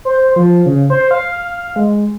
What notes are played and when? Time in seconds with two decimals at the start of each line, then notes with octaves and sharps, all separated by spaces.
0.05 C5
0.36 F3
0.66 C#3
0.90 C5
1.11 F5
1.76 G#3